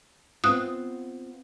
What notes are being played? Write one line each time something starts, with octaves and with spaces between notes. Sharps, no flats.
B3 C4 F4 D#6 F#6